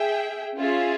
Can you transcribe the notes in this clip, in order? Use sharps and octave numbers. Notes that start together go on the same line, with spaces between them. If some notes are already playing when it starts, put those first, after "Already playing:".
Already playing: G#4 E5 G5
C#4 F4 G#4 E5